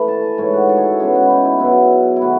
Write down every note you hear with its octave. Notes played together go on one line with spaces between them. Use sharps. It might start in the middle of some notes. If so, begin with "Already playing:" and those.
Already playing: E3 A3 B5
A5
G#5
G#2 E3 A3 C#5
F#4
A4
G#4
A4
C#3 G#3 B3 G#4
F#4
E4
D#4
E4
B2 F#3 B3 E4
E4
D#3 A3 F#4